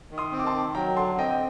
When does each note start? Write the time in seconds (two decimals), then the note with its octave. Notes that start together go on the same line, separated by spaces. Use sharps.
0.11 D#3
0.18 C6 D#6
0.32 C4
0.39 D6
0.46 A5 C6
0.54 D#3
0.75 F#3 G5 A#5
0.96 D3 A5 C6
1.18 C4 D#5 G5
1.32 D#5